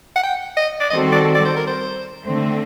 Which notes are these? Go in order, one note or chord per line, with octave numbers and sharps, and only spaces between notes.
F#5
G5
D#5
D5
D#3 G3 C4 F#4 A4 D#5
D5
D5
C5
A#4
C5
D3 A3 C4